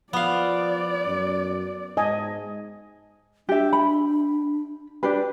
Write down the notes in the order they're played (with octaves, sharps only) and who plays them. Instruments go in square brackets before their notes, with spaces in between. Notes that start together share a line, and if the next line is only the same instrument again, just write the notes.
[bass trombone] F3 [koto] B3 F5 [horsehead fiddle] D5
[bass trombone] F#2
[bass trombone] G#2 [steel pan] D#5 G#5 A5
[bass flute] D4 [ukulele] G4 E5
[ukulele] B5
D4 G4 B4